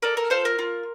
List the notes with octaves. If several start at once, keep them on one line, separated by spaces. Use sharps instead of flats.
A4 A#4 D5
A#4
F4 A4 C5
A#4
F4